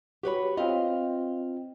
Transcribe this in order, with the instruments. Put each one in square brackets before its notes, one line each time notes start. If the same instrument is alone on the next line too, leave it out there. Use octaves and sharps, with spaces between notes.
[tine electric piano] F#4 B5 [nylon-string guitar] G4 B4 C#5
[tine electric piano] C4 F4 [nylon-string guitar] D#5 F5